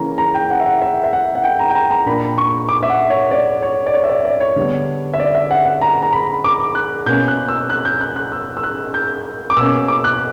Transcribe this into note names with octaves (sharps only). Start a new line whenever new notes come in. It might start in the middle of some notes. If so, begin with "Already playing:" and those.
Already playing: C#3 E3 A#3 C#4 A#5
A#5
G5
F#5
E5
F#5
E5
E5
F#5
F#5
G5
A#5
G5
A#5
A#5
A#2 A#3 D4 B5
C#6
D6
E5
F#5
C#5
D5
C#5
D5
C#5
E5
D5
D5
C#5
D3 G3 B3 D4
E5
D5
E5
F#5
F#5
A#5
A#5
B5
D6
F#6
B2 A#3 C#4 G6
F#6
E6
F#6
G6
F#6
F#6
E6
E6
F#6
G6
D6
B2 A#3 C#4 E6
D6
F#6